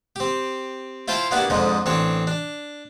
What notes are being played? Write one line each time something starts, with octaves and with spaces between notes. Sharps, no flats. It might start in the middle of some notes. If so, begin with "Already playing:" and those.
C4 G4
E4 F4 C5 G5 A5 B5
A#3 B3 D4 E4 F#4 G4
F2 G#2 D3 F3 D#4
A1 C4 D4 C#5
D4